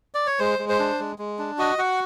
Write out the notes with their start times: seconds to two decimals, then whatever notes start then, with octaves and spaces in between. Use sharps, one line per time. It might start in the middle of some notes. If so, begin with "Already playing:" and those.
0.14 D5
0.27 C#5
0.39 G#3 C5
0.59 G#3
0.69 C5
0.79 D4
0.99 G#3
1.18 G#3
1.38 D4
1.58 F#4 D#5
1.78 F#4 F#5